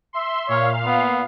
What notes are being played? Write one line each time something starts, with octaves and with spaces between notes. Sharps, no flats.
E5 C6
A#2 C#5 F5
B3